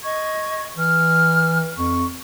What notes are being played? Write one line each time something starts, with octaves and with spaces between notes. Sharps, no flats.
D#5 C#6 G#6
E3 F6
F2 C#6